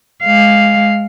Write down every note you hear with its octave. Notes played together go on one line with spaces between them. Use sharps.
G#3 F5